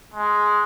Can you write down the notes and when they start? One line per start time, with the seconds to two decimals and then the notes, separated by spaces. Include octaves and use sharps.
0.14 G#3